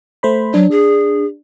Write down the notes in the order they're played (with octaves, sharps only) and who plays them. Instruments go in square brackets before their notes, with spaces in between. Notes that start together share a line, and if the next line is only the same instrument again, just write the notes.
[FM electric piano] A3 C5 B5
[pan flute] F#3 [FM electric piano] D4
[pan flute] G#4